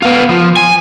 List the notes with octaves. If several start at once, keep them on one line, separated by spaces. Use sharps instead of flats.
B3 F4
F3
G#5